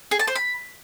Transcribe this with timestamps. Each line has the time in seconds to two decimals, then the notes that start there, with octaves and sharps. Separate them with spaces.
0.11 G#4
0.19 A5
0.27 C5
0.35 B5